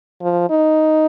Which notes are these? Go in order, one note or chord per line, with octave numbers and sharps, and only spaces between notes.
F3
D#4